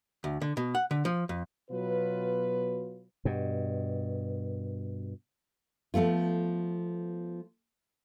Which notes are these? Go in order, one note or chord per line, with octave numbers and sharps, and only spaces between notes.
D2
D3
B2
F#5
D3
F3
F2
B2 F#3 F4 B4
G2 B2
F3 A3 B3 F4